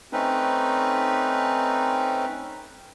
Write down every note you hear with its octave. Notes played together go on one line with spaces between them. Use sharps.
A3 C4 C#4 D#4 B4